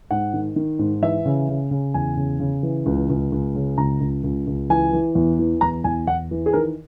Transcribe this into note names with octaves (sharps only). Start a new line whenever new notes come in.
G#2 F#5
D#3
D#3
G#2
E3 E5
C#3
C#3
C#3
E2 G#5
C#3
C#3
E3
C#2
C#2
C#2
C#3
C#2 A#5
C#2
C#2
C#2
E3 G#5
E3
E2
E3
E2 A#5
E2 G#5
E2 F#5
E3
G#4
D#3 A#4